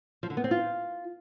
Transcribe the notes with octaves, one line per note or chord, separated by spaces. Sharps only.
F3
D3
B3
C4
F4